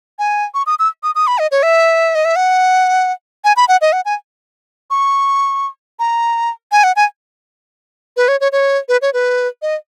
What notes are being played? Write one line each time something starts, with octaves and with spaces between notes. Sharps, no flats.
G#5
C#6
D#6
E6
D#6
D#6
B5
D#5
C#5
E5
D#5
E5
F#5
G#5
B5
F#5
D#5
F#5
G#5
C#6
A#5
G#5
F#5
G#5
B4
C#5
C#5
C#5
B4
C#5
B4
D#5